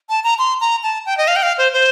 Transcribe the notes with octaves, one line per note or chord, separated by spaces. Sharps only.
A5
A#5
C6
A#5
A5
G5
D#5
F5
G5
F5
C5
C5